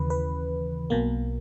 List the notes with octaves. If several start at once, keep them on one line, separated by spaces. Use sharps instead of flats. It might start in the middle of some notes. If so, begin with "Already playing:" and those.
Already playing: D#2 C#3 E3 B4
B4
B1 B2 A#3